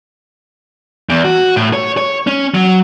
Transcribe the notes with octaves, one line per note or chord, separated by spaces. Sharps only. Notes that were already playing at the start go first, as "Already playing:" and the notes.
E2
F#4
A2
C#5
C#5
C#4
F#3